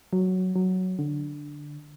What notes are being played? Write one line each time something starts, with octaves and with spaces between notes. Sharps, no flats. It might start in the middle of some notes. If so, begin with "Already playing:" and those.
F#3
F#3
D3